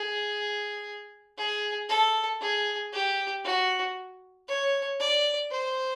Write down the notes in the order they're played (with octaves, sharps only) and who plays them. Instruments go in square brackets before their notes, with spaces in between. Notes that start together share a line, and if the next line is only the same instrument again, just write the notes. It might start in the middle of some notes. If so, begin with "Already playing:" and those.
Already playing: [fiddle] G#4
G#4
A4
G#4
G4
F#4
C#5
D5
C5